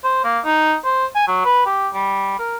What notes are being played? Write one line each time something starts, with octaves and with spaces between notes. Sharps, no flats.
C5
A#3
D#4
C5
G#5
F#3
B4
G4
G3
A#4